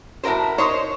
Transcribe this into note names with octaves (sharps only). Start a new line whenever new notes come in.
A2 E4 F#4 A#4 C5
D#4 C5 C#5